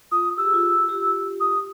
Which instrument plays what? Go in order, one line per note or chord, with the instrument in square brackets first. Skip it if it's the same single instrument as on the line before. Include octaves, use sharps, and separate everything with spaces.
[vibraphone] F4 [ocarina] D#6
[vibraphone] G4 [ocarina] E6
[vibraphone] G#4
F4 G4
F4 G4
[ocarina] D#6